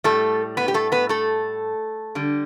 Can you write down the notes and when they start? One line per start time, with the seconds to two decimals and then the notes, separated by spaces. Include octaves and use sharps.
0.04 A2 G3 A3 A4
0.57 B3 B4
0.68 G4
0.74 A3 A4
0.92 B3 B4
1.09 A3 A4
2.15 D3 G3